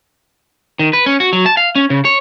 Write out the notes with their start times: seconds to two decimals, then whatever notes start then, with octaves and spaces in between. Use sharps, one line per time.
0.79 D#3
0.93 B4
1.06 C#4
1.20 F#4
1.33 F#3
1.46 A5
1.57 F5
1.75 C#4
1.90 C#3
2.05 C#5